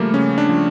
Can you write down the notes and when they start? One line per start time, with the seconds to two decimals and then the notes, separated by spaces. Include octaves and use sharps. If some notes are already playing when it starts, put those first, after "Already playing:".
Already playing: C#3 F3 G3 A3 A#3
0.14 C#3 C#4
0.38 D4
0.49 F3